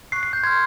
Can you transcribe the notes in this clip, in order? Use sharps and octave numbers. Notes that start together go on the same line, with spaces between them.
C#6 F#6 C7
C7
G6
C6 F6 G#6